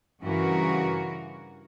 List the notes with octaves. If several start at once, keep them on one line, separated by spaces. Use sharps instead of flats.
G2 C#3 E3 F#4 A#4